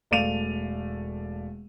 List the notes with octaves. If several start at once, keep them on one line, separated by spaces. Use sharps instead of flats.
E1 A3 D5 F5 D#7 F7